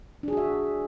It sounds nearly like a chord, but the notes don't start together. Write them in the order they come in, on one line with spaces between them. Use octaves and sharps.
D4 G#4 F#4 E5